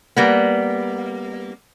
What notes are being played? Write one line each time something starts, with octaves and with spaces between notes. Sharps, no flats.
G3 A#3 B3